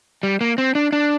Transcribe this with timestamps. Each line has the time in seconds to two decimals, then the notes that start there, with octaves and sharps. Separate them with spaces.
0.23 G3
0.41 A#3
0.58 C4
0.75 D4
0.93 D4